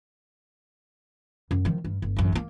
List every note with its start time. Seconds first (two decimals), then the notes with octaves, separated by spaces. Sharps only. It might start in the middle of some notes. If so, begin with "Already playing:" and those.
1.51 F#2
1.65 D#3 F3
1.84 G2
2.02 G1
2.16 A1 F#2
2.32 G3 A#3